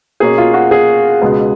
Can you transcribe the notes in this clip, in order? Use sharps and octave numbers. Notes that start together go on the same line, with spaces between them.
B2 A#3 C#4 G#4
F4
F#4
G#4
C#2 B2 G#3 B3